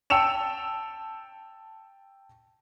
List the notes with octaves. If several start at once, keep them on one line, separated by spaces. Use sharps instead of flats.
G5 A5 E6 C#7 E7 F7